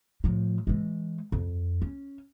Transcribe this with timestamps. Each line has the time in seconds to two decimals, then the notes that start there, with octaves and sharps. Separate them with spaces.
0.24 A2 F3
0.67 E3 G#3
1.32 F2
1.82 C#4